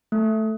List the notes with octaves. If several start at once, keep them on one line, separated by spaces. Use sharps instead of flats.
A3